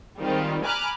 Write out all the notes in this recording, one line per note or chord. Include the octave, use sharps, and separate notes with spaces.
D#3 G3 G#3 C4 F4 G4
G#5 A#5 B5 D6 F6 F#6